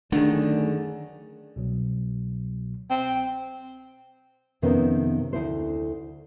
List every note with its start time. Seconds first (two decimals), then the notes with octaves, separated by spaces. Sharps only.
0.12 F#2 D3 D#3 A3 D4 G#4 D5
1.56 C2 B2 F#3
2.90 C4
4.62 F2 C3 D#3 B3 C#4
5.33 D2 E4 C5